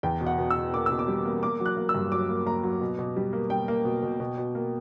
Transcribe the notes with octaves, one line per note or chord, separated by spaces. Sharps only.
E2 G5
B2
F#5
B2
E6
B2
A#3 D6
B2 E6
D6
G3
A#3
A#3 D6
F#3
F#6
A#3
E6
G2
F#3 D6
A#3
A#3 A#5
F#3
B2
B2
G3
A#3
G3 G5
A#3
B2
B2
B2
B2
A#3